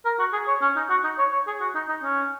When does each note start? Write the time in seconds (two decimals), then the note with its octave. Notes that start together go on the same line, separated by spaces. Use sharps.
0.05 A#4
0.19 F#4
0.33 G#4
0.47 C#5
0.61 C#4
0.76 D#4
0.89 F#4
1.04 D#4
1.18 C#5
1.32 C#5
1.47 G#4
1.61 F#4
1.75 D#4
1.89 D#4
2.03 C#4